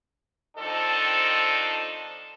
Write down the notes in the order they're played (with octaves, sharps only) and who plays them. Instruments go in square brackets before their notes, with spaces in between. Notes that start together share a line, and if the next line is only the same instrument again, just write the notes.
[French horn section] D#3 F3 C4 D4 D#4 A4